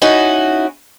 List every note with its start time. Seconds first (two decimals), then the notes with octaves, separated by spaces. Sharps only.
0.02 C#4 D#4 E4 F#4